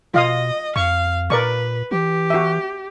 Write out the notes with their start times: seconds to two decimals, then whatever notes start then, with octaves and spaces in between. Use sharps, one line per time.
0.14 B2 F4 D#5 F5 D#6
0.76 F2 F5 C#6
1.30 A#2 A#4 B4 D5 C#6
1.91 E3 G4
2.30 F#4 E5